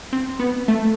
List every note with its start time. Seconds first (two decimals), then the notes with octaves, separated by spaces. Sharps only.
0.13 C4
0.39 B3
0.68 A3